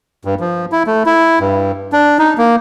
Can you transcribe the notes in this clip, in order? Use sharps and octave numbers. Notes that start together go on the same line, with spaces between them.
G2
F3
E4
A3
E4
G2
D4
D#4
A#3